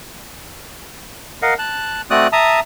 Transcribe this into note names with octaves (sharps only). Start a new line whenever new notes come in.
A#4 D#5 F5 F#5
A5 F#6
A3 C4 F#4 D5 D#6 F#6
E5 A5 A#5 D#6